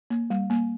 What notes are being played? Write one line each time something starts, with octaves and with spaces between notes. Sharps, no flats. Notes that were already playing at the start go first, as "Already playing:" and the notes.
A#3
G3
A#3